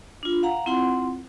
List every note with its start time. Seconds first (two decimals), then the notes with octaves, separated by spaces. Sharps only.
0.23 D4 F4
0.43 F5 F#5 A#5
0.66 C4 E4 F4 F#5 C6